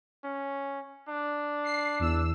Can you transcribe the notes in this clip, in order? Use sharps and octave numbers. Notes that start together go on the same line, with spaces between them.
C#4
D4
C7
E2 E6